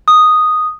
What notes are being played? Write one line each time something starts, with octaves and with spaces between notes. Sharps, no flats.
D#6